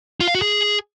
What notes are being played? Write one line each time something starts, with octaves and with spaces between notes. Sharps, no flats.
F4
F5
F#4
G#4